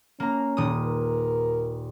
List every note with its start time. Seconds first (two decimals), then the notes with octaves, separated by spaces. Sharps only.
0.20 A#3 C#4 A#5
0.57 D#1 D#6
0.86 A#4